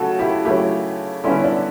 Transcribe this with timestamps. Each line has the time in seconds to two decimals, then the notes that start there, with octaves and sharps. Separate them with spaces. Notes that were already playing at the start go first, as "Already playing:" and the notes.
Already playing: C#3 F#3 A3 F#4 A4
0.19 E4 G4
0.45 C#3 F#3 A3 E4 G4
1.24 D3 G3 B3 C#4 E4
1.44 D4